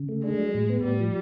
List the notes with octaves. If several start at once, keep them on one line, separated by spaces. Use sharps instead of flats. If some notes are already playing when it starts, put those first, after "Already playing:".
Already playing: C#3
A3
G#3 D4
F#3
A2
B3
A2 G3
F3